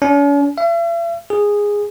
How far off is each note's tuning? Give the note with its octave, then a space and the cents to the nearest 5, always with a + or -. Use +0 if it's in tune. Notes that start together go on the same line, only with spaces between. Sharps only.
C#4 +45
E5 +45
G#4 -10